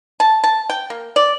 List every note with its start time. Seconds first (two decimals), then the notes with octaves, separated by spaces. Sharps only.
0.20 A5
0.44 A5
0.70 G5
0.90 A#3
1.16 D5